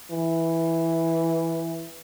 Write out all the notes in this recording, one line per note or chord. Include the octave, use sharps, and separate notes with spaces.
E3